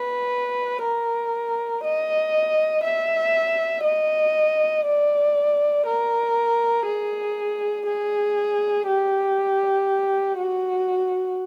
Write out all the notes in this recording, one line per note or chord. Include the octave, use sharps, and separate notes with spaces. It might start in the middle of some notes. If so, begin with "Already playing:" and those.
Already playing: B4
A#4
D#5
E5
D#5
D5
A#4
G#4
G#4
G4
F#4